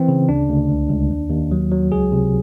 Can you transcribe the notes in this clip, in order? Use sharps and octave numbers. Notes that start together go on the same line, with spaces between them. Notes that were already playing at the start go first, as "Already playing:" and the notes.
Already playing: E3 C4
C#3
D2 D4
D2
C#2
C#2
D#2
D#2
F#3
F#3
C#2 G#4
C3